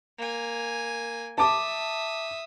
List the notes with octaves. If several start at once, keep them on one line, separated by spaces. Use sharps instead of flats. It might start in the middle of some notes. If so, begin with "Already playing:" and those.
A#3 G#5
E5 A5 D6 D#6